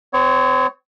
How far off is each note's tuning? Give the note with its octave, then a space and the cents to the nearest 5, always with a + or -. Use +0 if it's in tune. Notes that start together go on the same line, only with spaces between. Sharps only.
C4 -35 C#5 +0